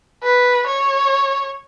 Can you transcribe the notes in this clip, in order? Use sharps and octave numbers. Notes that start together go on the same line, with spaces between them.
B4
C#5